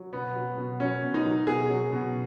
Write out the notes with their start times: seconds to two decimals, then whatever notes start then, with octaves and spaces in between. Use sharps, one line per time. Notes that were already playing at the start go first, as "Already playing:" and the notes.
Already playing: F#3
0.13 B2 B3
0.35 F#3
0.57 B2
0.79 F#3 C#4
1.02 B2
1.14 D#4
1.25 F#3
1.47 B2 G#4
1.70 F#3
1.92 B2